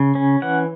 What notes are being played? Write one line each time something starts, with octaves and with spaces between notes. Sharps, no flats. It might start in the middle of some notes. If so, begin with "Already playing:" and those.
Already playing: C#3
C#4
E3 F#5